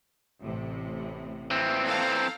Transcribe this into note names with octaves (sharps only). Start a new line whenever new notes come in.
A1 A2 C3
E3 C4
A4 F5 A#5